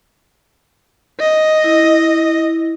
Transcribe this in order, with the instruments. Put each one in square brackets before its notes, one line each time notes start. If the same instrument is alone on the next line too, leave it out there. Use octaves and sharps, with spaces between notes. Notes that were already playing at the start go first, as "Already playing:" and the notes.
[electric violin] D#5
[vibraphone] E4